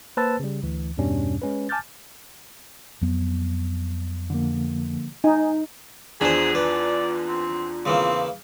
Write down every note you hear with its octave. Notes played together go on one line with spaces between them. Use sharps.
A#3 B4 C5 A5 E6 A6
C#3 G3
D2 E3
E2 G2 B2 G3 C#4 D4
G#3 C#4 B4
G#5 A5 D6 F6 G6 A6
F2 F#3 B3
D3 F3 A#3
D#4 D#5 G#5
E2 D4 F4 G#4 C5 G#5 B5
B4 D5
C4
C#3 E3 A#3 C4